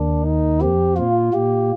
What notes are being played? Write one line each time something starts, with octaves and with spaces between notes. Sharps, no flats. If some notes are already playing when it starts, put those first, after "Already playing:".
Already playing: D#2 D#3 D4
D#4
F2 F3 G4
A#2 A#3 F4
A#2 A#3 G4